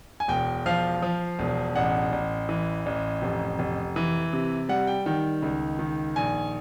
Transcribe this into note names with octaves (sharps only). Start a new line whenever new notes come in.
G#5
E1 G5
F3 F5
F3
E1
A1 F#5
A1
E3
A1
F1
F1
E3
C3
G3 F#5
G5
D#3 G5
C#2
D#3
A#1 G#5